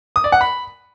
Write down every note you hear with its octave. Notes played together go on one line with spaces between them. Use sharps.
D#6
D5
F#5
B5